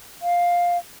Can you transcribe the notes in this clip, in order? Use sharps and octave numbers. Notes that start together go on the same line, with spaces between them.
F5